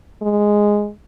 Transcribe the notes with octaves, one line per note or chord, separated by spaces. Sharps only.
G#3